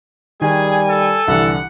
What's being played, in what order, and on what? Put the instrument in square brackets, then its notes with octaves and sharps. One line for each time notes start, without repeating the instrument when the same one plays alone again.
[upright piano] D#3 [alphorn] G3 [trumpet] G#4 [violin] G#5
[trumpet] A4
[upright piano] C2 E3 [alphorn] D3 [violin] F#5